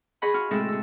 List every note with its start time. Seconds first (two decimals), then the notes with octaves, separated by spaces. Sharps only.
0.22 G#4 C5 D#5 F#5 B5 C#6
0.34 F4 F#4 F6
0.51 A2 C3 G#3 F#4 A4 E5
0.69 C3 E6